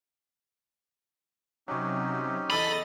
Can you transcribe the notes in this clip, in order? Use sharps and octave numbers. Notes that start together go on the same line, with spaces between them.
C3 F#3 C#4 D#4 G4
E2 A4 D#5 B5 A6